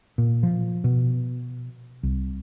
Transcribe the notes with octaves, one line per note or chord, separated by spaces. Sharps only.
A#2
F3
B2
C2